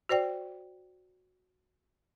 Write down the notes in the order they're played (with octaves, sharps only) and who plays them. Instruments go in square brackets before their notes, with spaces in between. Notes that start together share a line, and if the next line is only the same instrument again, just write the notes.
[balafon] F#4 C5 D5 G5